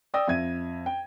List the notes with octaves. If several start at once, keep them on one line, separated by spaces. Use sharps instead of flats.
D5 G5 D#6 E6 A#6
F2 E5 G#6 D#7
G5